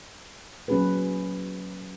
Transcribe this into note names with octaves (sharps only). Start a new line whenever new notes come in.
F#3 A#3 C#4 F#4 G#4 B4